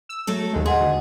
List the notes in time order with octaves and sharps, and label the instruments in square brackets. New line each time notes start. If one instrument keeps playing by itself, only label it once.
[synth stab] E6
[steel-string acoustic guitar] F#3 A3 A4
[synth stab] D#2 G#3
[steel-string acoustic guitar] G#4 [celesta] D#5 F#5 C6
[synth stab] D2